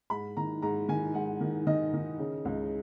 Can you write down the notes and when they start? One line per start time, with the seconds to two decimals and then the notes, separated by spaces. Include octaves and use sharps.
0.10 G#2 B5
0.37 D#3 A#5
0.62 G#2 A#5
0.88 D#3 G#5
1.14 G#2 F#5
1.41 D#3
1.67 D#3 D#5
1.94 D#3
2.19 C#3
2.45 C#2